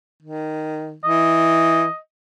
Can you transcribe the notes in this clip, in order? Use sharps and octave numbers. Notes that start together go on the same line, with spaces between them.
D#3
E3 D#5